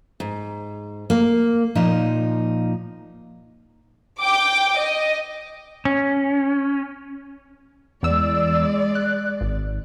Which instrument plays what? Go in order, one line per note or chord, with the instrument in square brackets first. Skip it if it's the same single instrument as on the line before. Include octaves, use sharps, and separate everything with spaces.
[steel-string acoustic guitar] G#2
A#3
A#2 F3 D#4
[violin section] G5 D6
D#5
[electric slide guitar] C#4
[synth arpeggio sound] E2 E6 [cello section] G#3 D5
[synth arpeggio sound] F#6
G#1